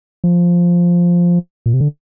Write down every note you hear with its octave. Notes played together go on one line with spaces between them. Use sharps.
F3
A#2
C3
D3